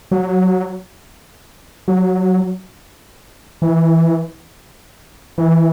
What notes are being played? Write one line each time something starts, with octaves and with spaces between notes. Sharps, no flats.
F#3
F#3
E3
E3